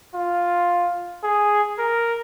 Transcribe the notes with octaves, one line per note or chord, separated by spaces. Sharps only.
F4
G#4
A#4